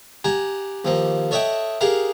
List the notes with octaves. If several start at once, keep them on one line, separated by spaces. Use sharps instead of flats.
G4 F#5 G#5 A#5
D#2 F3 A#3
A4 C#5 D#5 E5 F#5 G5
G4 G#4 A#4 F5 F#5